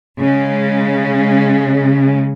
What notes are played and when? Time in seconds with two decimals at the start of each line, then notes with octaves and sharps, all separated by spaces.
0.20 C#3 G#3